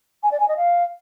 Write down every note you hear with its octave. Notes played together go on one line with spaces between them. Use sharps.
G#5
D5
G#5
D#5
F5